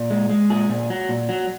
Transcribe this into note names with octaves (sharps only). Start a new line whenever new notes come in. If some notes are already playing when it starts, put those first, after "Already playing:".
Already playing: A#2
G#3
G#3
A#2 G#4
A#2
F#3
A#2
F#3